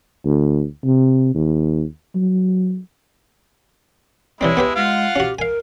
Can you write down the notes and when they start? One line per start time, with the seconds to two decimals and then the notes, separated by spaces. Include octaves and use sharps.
0.25 D2
0.85 C3
1.35 D#2
2.15 F#3
4.41 E3 G3 G#3 C4 E4 C#5
4.57 B3 G4 B4
4.76 G#3 F4 F5 F#5
5.16 C#4 F#4 G4
5.39 A#4 F5 G#5